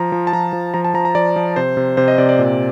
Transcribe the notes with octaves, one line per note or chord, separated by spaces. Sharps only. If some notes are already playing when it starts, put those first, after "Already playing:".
Already playing: F3 A#5
F3
A5
F3 A#5
F3
F3 A#5
A5
F3 A#5
A#5
F3 D5
F3
C3 C5
C3
C3 C5
D#5
C3 D5
D5
A#2